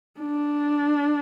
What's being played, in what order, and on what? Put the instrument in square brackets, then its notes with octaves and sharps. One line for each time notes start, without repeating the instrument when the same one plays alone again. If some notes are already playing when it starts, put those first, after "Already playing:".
[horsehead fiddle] D4